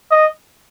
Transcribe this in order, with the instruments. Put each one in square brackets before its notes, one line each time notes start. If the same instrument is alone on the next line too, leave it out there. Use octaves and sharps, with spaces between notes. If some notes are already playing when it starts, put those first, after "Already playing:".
[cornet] D#5